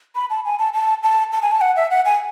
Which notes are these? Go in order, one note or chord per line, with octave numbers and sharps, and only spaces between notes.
B5
A5
G#5
A5
A5
A5
A5
G#5
A5
F#5
E5
F#5
G#5